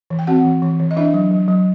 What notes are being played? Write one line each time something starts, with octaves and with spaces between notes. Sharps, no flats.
E3
G5
C4 F#4 F#5
E3
E3
E3
D#5
D4 E4 E5
F#3
F#3
F#3